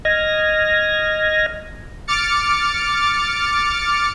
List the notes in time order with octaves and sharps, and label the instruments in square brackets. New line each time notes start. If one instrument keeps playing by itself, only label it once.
[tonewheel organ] D#5 F6 G#6 A#6
[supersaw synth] D6 F6 A6 C#7